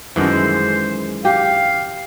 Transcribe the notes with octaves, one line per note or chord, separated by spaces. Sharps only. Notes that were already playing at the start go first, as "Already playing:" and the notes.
F#2 D#3 E3 G#3 A4 C5
G4 F5